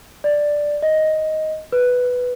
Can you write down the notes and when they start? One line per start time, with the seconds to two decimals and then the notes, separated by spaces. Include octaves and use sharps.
0.24 D5
0.82 D#5
1.72 B4